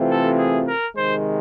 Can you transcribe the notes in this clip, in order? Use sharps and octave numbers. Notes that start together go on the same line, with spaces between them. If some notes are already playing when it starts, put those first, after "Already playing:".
Already playing: C3 E3 A3 C4 F4
A4
G#4
A#4
C3 D#3 G#3 C5